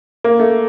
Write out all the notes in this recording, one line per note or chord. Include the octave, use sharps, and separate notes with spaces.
A#3
A3